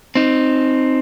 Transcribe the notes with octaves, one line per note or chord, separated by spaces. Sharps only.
C4 D#4